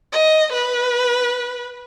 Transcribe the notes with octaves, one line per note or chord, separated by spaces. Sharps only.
D#5
B4